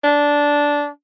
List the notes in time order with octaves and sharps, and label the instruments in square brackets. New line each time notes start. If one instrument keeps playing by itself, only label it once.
[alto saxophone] D4